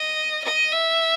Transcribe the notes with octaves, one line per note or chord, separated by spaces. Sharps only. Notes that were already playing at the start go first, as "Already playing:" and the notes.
Already playing: D#5
D#5
E5